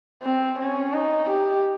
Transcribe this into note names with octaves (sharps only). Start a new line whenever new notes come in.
C4
C#4
D#4
G4